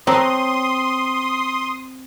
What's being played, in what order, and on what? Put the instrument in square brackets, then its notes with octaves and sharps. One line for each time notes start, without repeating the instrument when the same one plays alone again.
[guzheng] C4 [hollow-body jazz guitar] C#5 A5 A#5 [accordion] C6 D#6